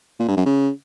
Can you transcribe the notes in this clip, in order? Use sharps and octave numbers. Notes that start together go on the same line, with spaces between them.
A#2
G2
F#2
C#3